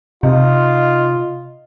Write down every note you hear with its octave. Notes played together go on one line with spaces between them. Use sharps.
C3 D#4 F4